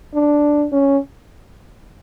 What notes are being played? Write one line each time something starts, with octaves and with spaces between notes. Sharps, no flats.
D4
C#4